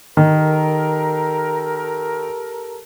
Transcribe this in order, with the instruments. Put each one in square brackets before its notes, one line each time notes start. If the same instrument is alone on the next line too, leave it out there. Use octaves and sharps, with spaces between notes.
[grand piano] D#3 [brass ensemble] G4 A4 A#4